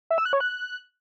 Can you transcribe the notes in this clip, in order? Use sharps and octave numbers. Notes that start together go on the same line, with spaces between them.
E5
E6
F#6
C#5
F#6